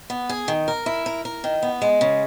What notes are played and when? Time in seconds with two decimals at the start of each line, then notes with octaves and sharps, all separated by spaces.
0.10 B3
0.29 G#4
0.48 D#3
0.68 A#4
0.86 E4
1.06 A#4
1.25 A#4
1.44 D#3
1.63 B3
1.82 G#3
2.01 C#3